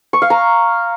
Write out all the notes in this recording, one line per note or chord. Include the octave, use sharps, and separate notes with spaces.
C#6
F5
A#5